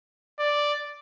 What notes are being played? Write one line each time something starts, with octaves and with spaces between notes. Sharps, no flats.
D5